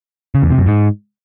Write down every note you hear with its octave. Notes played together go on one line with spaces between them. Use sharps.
C#3
E2
C3
F#2
G#2